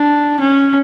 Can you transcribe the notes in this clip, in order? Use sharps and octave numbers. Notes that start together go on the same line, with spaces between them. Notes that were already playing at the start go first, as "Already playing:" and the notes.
Already playing: D4
C#4